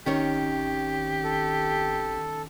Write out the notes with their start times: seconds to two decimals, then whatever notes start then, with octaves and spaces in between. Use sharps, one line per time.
0.06 G#1 D#3 C#4 G4 C#5
1.24 A4